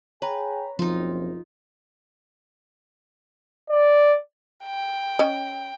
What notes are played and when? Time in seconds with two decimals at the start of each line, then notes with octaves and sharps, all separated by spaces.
0.22 G#4 B4 C#5 G5 G#5 A#5 B5
0.79 F#1 B1 F3 C4 D#4 F4
3.70 D5
4.64 G5
5.19 C#4 D#5